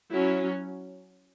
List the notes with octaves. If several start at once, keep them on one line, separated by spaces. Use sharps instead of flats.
F#3 C#4 E4